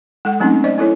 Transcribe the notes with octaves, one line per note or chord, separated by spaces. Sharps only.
G#3 A4 F#5
F#3 A3 C4 C#4 D#4
C5 D5 D#5
B3 E4 A4 C#5